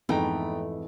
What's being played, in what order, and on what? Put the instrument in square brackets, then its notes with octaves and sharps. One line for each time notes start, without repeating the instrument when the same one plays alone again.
[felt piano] F2 G#2 [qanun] E3 A3 [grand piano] B3 G5 A#5